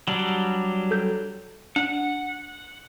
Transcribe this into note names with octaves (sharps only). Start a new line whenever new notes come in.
F#3 G3 D4
A4 G6
D4 F#5